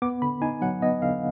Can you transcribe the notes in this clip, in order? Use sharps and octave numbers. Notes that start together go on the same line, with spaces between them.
B3 D6
D3 B5
D#4 G#5
F#3 F#5
B3 D#5
D3 F5